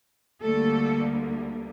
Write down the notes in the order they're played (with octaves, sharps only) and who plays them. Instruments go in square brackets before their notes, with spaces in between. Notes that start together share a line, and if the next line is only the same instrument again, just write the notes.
[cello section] D2 D3 G3 A3 A#3 A4